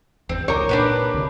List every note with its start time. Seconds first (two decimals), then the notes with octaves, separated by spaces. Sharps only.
0.29 G#1 E2 C4
0.48 C#2 D#4 A#4 C#5 D6
0.69 A#2 D4 G4 B4
1.14 D2 C3